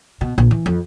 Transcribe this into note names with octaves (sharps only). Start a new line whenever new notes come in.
B2
A#1
E3
F2